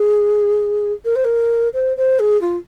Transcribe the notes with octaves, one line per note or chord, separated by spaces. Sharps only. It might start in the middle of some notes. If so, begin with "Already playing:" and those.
Already playing: G#4
A#4
C5
A#4
C5
C5
G#4
F4